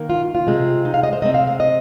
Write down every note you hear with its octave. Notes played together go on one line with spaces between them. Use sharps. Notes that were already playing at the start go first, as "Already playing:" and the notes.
Already playing: D#3 A#3
F4
F4
C3 G#3 C4
D#4
F5
D#5
C5
C3 G#3 C4 D#5
F5
F5
D#5